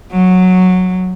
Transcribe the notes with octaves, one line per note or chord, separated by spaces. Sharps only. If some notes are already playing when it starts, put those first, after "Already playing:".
F#3